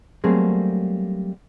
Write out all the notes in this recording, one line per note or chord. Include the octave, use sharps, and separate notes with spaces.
F#3 G3 A3 A#3 C4 G#4